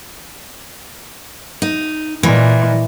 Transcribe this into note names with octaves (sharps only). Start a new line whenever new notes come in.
D#4
A#2 E3 D#5